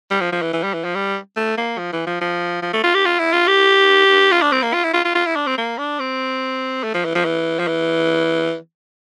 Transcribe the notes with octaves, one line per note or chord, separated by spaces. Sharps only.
G3
F3
F3
E3
E3
G3
E3
F3
G3
A3
A#3
F3
E3
F3
F3
F3
A3
F4
G4
F4
E4
F4
G4
F4
D4
C4
A#3
F4
E4
F4
F4
F4
E4
D4
C4
A#3
D4
C4
A3
F3
E3
F3
E3
F3
E3